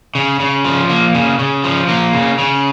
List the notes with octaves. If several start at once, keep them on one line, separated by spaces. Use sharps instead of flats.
C#3
C#3
F3
A#3
C#3
C#3
F3
A#3
C#3
C#3